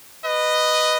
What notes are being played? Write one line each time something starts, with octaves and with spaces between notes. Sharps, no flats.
B4 D#5